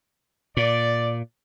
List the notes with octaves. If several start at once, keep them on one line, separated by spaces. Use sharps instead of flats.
A#2 D5